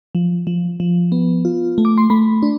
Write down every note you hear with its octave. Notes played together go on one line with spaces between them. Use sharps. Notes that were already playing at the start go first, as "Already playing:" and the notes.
F3
F3
F3
B3
F4
A3
D6
C6
A3 B5
D4